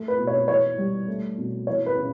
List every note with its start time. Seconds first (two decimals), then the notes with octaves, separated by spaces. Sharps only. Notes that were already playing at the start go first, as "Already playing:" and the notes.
Already playing: A3
0.08 B4
0.19 B2
0.27 C#5
0.48 E3 C#5
0.78 G3
1.08 A3
1.38 B2
1.67 E3 C#5
1.86 B4
1.97 C#3